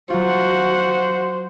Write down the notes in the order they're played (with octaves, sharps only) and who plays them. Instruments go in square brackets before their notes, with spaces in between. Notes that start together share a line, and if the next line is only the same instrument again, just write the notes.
[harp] F#3 F4 [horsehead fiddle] F#4 F#5 [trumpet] C5